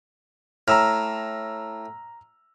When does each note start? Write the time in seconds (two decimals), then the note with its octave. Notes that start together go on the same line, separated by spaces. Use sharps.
0.68 A2 A#5 E6 F6